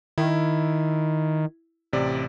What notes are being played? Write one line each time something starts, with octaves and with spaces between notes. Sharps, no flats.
D#3 E4
A1 C3 D5